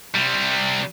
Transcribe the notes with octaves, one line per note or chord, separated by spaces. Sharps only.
C3 G3